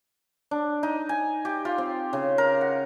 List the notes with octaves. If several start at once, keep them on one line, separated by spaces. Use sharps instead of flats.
D4
D#4
G#5
G4
F4
C4
C#3
A#4
F#5